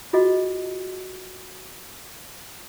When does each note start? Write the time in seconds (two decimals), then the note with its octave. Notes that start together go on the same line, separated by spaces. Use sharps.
0.13 F4 F#4 G#4 D#5